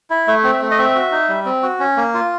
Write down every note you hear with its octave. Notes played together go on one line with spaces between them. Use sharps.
E4
A3 E5
C4
E5
A3
D#5
C4 E5
F#4
D#4
G3
C4
F#4
C#4
A#3
F4